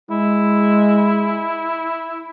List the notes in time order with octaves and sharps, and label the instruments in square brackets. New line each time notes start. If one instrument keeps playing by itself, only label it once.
[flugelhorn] G#3 [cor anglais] E4